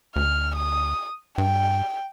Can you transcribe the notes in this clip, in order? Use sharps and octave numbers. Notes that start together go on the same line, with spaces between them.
D2 F6
D#6
G2 G5